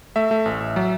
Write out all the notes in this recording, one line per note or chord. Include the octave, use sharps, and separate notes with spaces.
A3 E5
A3
A1
A1
F#3